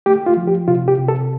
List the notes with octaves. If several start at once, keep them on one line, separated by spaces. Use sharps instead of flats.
A3 G4
F4
F3
G4
C3 F4
G4
C3
A4